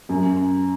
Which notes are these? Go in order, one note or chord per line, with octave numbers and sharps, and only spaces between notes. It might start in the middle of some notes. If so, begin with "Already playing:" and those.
F#2